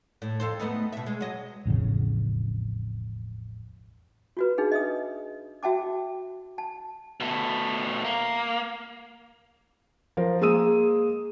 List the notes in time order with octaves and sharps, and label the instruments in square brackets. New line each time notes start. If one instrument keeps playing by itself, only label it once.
[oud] A2
F2 A4 C5
A3 B3 D#4
B2 E5
G#3
F#3 D#5
[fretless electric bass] E1 A1 F2 C#3
[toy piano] F4 F#4 B4
D4 D#4 G#4
D#5 E5 D#6
F#4 E5 G5 A5 D6
A5
[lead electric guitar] B2 A3
A#3
[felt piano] F3 A#4 C5
G#3 A#3 G#4 D#6 E6 D#7